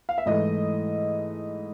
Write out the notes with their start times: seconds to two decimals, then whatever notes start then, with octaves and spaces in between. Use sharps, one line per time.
0.09 F5
0.18 E5
0.26 G#2 E3 A3 D#5